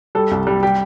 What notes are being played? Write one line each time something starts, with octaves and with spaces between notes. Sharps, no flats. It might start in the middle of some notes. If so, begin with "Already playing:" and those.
G3 A4
C2
G3
G3 G4